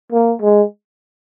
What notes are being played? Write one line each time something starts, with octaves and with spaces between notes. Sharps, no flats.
A#3
G#3